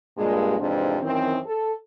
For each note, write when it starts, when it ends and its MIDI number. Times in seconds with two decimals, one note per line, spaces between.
0.17 0.58 43
0.17 0.58 46
0.17 0.58 56
0.59 0.97 41
0.59 0.97 44
0.59 0.97 48
0.59 0.97 52
0.59 0.97 60
0.59 0.97 62
1.02 1.37 42
1.02 1.37 51
1.02 1.37 52
1.02 1.37 60
1.45 1.71 69